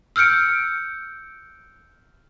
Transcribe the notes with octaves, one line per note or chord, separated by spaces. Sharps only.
E6 F6 G6 C#7 D7